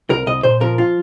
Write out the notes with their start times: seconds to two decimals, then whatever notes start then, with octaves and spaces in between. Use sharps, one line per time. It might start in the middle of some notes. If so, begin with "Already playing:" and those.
0.10 C2 A#4
0.26 C2 D#5
0.43 A#2 C5
0.60 F3 A#4
0.78 F4